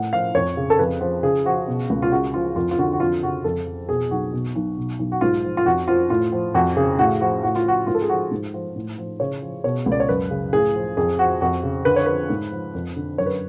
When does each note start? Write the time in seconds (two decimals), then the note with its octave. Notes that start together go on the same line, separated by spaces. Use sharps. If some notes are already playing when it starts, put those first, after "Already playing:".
Already playing: A2 F3 F#5
0.13 F3 F5
0.35 F2 C#5
0.57 C#3
0.70 A4
0.79 F2 B4
1.01 F3
1.23 C#3 G#4
1.45 F3 F#4
1.67 B2
1.90 C#2
2.02 F4
2.12 C#3 F#4
2.34 F3 F4
2.56 F2 F4
2.71 F4
2.78 D3 F#4
2.93 F#4
3.00 F2 F4
3.23 C#3 F#4
3.44 F2 A4
3.66 F3
3.89 B2 G#4
4.11 B1 F#4
4.33 B2
4.55 B1
4.77 B2
4.99 B1
5.12 F#4
5.21 G#2 F4
5.44 F3
5.57 F4
5.66 F2 F#4
5.88 F3 F4
6.10 A2 F4
6.32 F3
6.55 F2 F#4
6.77 C#3 G#4
6.99 A2 F#4
7.21 F3 F#4
7.43 A2 F#4
7.55 F4
7.65 F3 F#4
7.87 G#2 F4
7.95 A4
8.02 G#4
8.09 F3 F#4
8.31 G#2
8.54 F3
8.76 A2
8.98 F3
9.20 C#3 C#5
9.42 F3
9.64 B2 C#5
9.86 C#2
9.92 D5
10.00 C#5
10.09 F#2 B4
10.31 C#3
10.53 A2 G#4
10.75 F3
10.97 F2 G#4
11.19 F3 F#4
11.41 F2 F#4
11.63 C#3
11.85 D3 B4
11.96 C#5
12.06 F3 B4
12.30 G#2
12.52 F3
12.75 F2
12.96 D3
13.18 F#2 C#5
13.26 B4